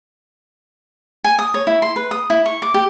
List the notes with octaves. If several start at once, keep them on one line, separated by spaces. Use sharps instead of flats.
G#5
D#6
C#5
E4
C6
B4
D#6
E4
C#6
D6
G4